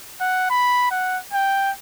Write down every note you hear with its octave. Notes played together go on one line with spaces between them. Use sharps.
F#5
B5
F#5
G5